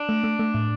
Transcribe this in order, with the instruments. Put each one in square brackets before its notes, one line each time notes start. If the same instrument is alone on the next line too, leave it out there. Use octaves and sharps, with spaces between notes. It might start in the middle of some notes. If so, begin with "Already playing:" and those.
Already playing: [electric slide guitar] D4
[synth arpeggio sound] A3
A3
A3
A2